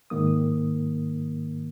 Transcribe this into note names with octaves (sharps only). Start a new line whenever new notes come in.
G#2 D#3 A#3 D#6